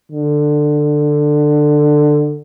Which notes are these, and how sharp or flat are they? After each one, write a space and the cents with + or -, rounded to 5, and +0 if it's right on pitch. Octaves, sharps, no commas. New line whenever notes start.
D3 +15